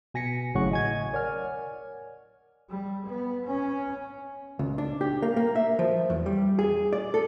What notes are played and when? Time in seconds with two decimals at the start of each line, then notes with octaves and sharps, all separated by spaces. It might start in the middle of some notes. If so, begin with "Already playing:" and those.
0.14 B2 G#5 A#6 B6 C#7
0.54 G#1 A2 C#3 F#3 F#5 C#6
0.71 D#5 G#5 G#6
1.13 A#4 C#5 D5 F#5 G#5 F6
2.69 G3
3.07 B3
3.46 C#4
4.59 C#2
4.78 D4
5.01 G4
5.22 A#3
5.36 A#3
5.55 E5
5.79 F3
6.10 E2
6.26 G3
6.59 G#4
6.93 D5
7.14 A4